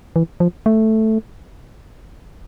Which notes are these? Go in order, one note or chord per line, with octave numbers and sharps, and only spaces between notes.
E3
F3
A3